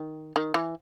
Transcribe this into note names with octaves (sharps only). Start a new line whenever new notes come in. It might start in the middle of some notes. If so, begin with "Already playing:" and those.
Already playing: D#3
D#3
E3